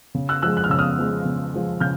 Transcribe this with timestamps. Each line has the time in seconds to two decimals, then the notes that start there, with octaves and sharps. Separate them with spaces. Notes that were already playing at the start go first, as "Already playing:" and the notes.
0.15 C#3
0.29 E6 F#6
0.42 F3 E6 F#6
0.46 G#3
0.57 F#6
0.64 F6
0.70 C#3 E6
0.79 D#6 F6
0.99 F3 G#3
1.25 C#3
1.54 F3 G#3
1.80 C#3 F6 G6